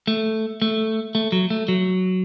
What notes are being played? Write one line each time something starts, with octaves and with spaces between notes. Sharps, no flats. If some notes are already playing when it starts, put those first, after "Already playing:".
A3
A3
A3
F#3
A3
F#3